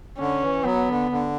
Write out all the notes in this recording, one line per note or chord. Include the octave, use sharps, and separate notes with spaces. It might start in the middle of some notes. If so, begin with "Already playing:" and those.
D3 C#4
E3
F#3 B3
D3
D3